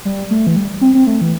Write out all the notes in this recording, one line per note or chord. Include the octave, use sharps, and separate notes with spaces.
G3
A3
E3
G3
C4
C4
A3
E3